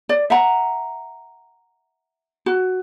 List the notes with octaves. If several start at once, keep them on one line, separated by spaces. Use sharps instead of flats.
D5
E5 F#5 A#5
F#4